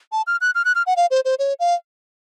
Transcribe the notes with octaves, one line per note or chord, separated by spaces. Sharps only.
A5
F6
F#6
F6
F#6
F6
F#5
F5
C5
C5
C#5
F5